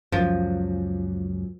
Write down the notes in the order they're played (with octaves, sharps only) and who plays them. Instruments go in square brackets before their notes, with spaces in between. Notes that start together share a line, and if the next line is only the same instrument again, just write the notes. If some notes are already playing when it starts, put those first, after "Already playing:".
[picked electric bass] C#2 F#2 [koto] F3